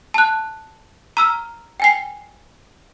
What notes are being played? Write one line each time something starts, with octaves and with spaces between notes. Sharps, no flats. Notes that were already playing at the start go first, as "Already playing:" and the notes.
A5 F#6
A#5 E6 F6
G5 G#5 C7